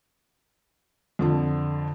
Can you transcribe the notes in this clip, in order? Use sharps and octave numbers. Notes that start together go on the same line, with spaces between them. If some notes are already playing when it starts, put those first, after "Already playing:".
F2 D3 F3